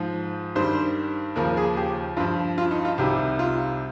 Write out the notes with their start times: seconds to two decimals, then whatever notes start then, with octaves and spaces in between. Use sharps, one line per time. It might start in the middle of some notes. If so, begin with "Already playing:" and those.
Already playing: G#2 F3
0.55 G2 D#3 G3 C5
1.36 D#2 C#3 F3 A#4
1.57 G#4
1.77 G4
2.17 G2 F3 F4
2.58 F4
2.71 D#4
2.85 F4
2.98 C2 C3 D#3 G3 G4
3.39 F4